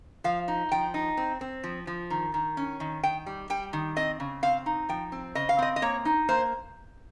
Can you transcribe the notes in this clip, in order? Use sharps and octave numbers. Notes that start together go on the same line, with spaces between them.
F3 F5
D#4
F3 G5
D#4
C4
C4
F3
F3
D#3
D#3
C#4
D#3
D#3 G5
G3
G3 G5
D#3
C4 D#5
C#3
C4 F5
D#4
F3 G5
C4
C#3 D#5
F5
C4 D#5
D#5
A#3 C#5
D#4
A#3 C5